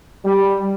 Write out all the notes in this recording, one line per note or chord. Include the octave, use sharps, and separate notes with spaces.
G3